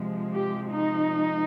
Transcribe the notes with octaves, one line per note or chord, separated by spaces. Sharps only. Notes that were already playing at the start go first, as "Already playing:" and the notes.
Already playing: C3 F3 G#3
G4
D#4